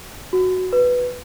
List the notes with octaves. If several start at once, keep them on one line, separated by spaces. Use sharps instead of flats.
F#4
B4